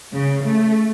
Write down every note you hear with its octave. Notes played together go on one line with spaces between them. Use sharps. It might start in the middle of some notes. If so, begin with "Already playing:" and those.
C#3
A3